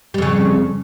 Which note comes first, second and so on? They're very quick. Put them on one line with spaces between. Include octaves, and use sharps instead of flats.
G3 F2 C#3